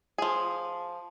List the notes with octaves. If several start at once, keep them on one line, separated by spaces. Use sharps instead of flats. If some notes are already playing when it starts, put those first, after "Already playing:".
F3 G#4